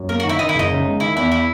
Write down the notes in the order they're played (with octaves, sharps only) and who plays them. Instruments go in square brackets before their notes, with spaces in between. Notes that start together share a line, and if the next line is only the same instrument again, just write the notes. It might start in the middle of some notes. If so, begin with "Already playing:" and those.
Already playing: [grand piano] F#2
[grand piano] A#3 [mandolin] A#4
[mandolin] F#4
[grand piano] D#3 [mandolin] E4
[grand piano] D#3 [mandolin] D#4
[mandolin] E4
[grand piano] F#1 [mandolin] D#4
[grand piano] C#3
G#3
[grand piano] D#3 [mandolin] E4
[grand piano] E2 [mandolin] E4
[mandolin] E4